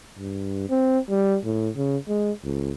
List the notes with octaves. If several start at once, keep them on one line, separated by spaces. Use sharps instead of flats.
G2
C4
G3
A2
C#3
G#3
C#2